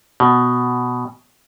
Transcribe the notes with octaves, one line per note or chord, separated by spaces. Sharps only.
B2